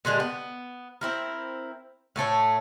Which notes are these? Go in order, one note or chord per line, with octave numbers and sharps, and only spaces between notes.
A#2 D3 G#3 G4
B3
C4 E4 A#4
A2 A3 A4 C#5